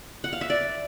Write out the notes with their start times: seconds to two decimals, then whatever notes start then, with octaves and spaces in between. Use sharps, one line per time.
0.24 F#5
0.33 F5
0.41 E5
0.50 D5